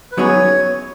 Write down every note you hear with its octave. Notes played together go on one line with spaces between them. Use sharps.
B4
F#2 F#3 B3 D#4 G#4 C#5